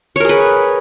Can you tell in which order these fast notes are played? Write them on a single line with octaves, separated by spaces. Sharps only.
C#5 A#4 G#4 B4